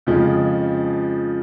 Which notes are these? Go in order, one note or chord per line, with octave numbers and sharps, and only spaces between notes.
F2 C#3 F3 G#3